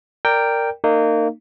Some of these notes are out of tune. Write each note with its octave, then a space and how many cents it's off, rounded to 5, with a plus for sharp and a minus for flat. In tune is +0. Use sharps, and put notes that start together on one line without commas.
A#4 -10 D5 +0 G5 +0
A#3 -25 D#4 -25